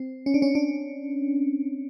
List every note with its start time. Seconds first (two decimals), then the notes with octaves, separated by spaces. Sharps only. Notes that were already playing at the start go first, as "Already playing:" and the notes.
Already playing: C4
0.26 C#4
0.34 D4
0.42 C#4
0.55 D4